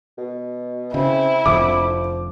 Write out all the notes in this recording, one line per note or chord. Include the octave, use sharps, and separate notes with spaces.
B2
C#3 C4 E4
F1 F2 D3 F3 D6